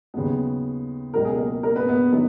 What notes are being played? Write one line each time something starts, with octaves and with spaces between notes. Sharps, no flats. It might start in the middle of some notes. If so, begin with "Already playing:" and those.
D#2 C#3 F#3 B3
C#2 B2 F#3 A#4
G#4
A#3 A#4
A#3 A#4
B3 B4
B3 B4
D#3 F#3 B3 B4